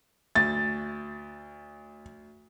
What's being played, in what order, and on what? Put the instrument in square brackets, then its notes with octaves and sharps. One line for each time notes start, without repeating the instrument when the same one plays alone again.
[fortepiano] D2 [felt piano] A6